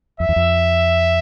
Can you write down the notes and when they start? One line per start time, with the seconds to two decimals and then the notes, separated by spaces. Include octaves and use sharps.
0.20 F2 E5
0.29 E2
0.36 F2